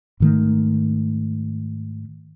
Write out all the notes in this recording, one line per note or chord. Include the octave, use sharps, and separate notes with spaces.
G#2 D#3 A3